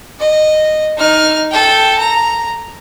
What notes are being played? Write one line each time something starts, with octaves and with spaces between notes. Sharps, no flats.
D#5
D#4 F6
A4 G5
A#5